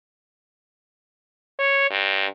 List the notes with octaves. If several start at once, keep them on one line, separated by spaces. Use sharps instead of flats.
C#5
G2